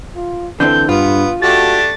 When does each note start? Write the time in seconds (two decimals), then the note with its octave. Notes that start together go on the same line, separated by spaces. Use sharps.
0.15 F4
0.60 D3 E3 C4 A4 G6
0.89 G2 B3 F4 B4
1.42 A3 D4 F#4 G4 A6